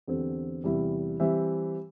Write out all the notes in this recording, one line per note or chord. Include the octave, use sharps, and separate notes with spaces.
E2 D3 C4 G4
E2 C3 G3 E4
E3 G3 C4 G4 E5